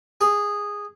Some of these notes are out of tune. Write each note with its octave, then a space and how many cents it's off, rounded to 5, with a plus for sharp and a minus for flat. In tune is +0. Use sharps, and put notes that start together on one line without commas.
G#4 -10